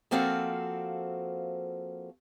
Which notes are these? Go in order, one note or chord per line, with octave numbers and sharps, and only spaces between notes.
F3 A#3 C4 F#4 A4 F5